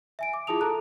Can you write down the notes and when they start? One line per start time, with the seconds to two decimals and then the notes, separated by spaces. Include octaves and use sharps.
0.19 E5 G#5 D7
0.34 D6
0.47 E4 F4 G#4 A5 D#6 F7
0.61 A4 A5 A#5 F#6